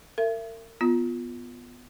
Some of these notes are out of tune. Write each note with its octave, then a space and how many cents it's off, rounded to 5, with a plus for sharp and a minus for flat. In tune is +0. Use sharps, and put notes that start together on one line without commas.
A#4 -40 E5 +30
B3 +0 F4 +0